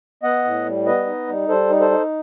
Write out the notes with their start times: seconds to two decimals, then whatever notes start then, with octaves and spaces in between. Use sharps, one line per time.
0.23 B3 D#5 F#5
0.44 A2
0.66 G3
0.86 B3 B4 D#5
1.06 D#4
1.27 G3
1.48 G3 A4 C5
1.70 D#4
1.80 A4 C5
1.91 D#4